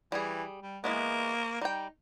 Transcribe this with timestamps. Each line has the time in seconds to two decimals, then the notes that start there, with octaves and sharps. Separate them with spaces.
0.12 E3 G3 G#4
0.62 G3
0.84 E3 G#3 A#3 B3
1.61 G3 D#4 G5